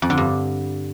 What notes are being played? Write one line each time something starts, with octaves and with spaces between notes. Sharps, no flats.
F2
D3
G2